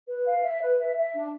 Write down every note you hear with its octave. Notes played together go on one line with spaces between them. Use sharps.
B4
F5
E5
B4
E5
E5
D4